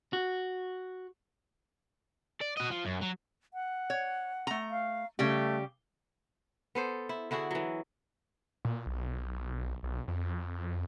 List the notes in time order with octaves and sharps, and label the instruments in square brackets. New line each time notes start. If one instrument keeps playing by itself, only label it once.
[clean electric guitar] F#4
[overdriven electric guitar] D5
F#4 D#5
F3
F#2
F#3
[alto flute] F#5
[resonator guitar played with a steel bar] C#5
A3 A#5
[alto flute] F5
[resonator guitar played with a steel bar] C#3 G3 G4 [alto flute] A3
[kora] B3 A4 C5
E4
D3 E4 F#4 G#4
E3 F#3
[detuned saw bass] A#2
B1
B1
F2